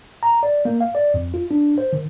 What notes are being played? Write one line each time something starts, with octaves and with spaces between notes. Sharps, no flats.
A#5
D5
A#3
F5
D5
F2
F4
D4
C5
D#3